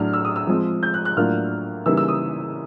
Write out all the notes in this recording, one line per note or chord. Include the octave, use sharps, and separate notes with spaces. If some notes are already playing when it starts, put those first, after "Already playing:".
Already playing: A2 F#3 A3 D4 F6
E6
D#6
E6
F3 G#3 C4
G6
F#6
F#6
A2 F#3 A#3 D4 F4 F6
C#3 E3 G3 A#3 D#4 E6
E6
D#6